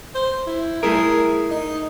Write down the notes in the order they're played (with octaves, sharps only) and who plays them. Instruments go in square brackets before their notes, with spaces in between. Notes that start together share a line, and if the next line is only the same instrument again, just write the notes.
[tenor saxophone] C5
E4
[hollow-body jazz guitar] A3 E4 A#4 [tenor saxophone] G#4
[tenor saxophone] D#4